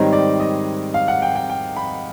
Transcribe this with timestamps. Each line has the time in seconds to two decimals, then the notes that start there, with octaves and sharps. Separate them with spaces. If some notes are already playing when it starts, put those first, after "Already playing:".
Already playing: G#2 D#3 G3 C4 D#4 C#5
0.13 D5
0.40 D#5
0.94 F5
1.08 F#5
1.22 G5
1.36 G5
1.50 G5
1.76 B5